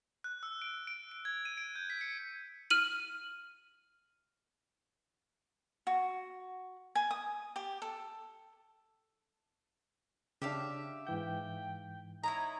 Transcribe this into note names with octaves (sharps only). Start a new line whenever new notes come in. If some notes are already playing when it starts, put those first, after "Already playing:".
F#6
E6
D7
D7
D7
G#6
D#7
D7
G6
B6
C#7
F6 D#7 F#7
F#4
G#5
D#6
G4
A4
C#3 D4 G4 E5 F5
G#2 E3 G5 G6
D#4 E4 C#5 A#5